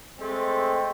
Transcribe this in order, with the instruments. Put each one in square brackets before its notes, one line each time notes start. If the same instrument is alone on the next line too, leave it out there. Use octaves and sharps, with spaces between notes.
[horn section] G#3 A3 C4